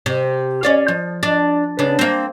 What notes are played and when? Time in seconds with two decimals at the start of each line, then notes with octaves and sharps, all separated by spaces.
0.06 C3
0.63 C#4 D5 F5
0.88 F3
1.23 D4
1.79 C#3 B3 D4
1.99 A#3 C4